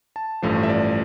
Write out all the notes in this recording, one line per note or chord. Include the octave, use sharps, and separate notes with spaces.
A5
A1 G2 F3 A3 C5
E5
D5